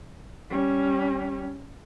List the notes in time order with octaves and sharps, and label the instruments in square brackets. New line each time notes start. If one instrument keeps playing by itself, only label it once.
[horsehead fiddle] G3 C#4